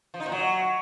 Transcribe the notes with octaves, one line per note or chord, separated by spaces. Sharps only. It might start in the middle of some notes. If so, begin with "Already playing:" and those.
F3
D#4
A#2
F#3